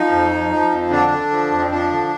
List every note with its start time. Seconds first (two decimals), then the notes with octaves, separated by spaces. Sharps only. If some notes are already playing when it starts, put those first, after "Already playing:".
Already playing: F3 D#4
0.11 F2
0.31 F3
0.51 F3
0.71 F2
0.91 D3 D4
1.11 D3
1.30 F3
1.51 F2
1.59 C4
1.70 F3 D4
1.90 D3